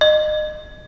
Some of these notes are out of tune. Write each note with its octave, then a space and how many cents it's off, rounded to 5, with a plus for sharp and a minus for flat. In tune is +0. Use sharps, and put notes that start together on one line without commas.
D#5 -30